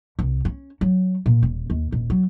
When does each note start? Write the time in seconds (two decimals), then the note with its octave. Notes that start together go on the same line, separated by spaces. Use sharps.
0.19 C2
0.45 C#4
0.81 F#3
1.26 A#2
1.43 D#1
1.70 D#2
1.92 D#1
2.10 F#3